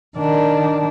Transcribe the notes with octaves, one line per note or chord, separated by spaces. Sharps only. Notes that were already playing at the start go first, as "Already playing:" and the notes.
D#3 D4